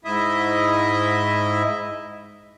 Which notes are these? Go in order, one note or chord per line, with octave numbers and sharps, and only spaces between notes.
G#2 E4 D#5 E5